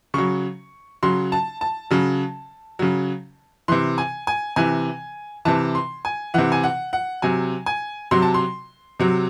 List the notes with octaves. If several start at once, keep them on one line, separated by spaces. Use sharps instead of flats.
C#3 F#3 C#6
C#3 F#3 C6
A5
A5
C#3 F#3
C#3 F#3
C3 E3 C6
G#5
G#5
C3 E3 G#5
C3 E3 A5
C6
G#5
C3 E3 F#5
G#5
F#5
F#5
C3 F#3 G#5
G#5
C3 F#3 C6
A5
C6
C3 F#3